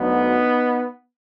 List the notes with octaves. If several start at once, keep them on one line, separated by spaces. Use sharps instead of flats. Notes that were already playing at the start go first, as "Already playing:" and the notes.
Already playing: D2 D3 F#3 B3 D#4